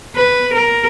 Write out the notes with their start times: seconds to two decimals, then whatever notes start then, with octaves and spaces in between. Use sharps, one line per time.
0.16 B4
0.54 A#4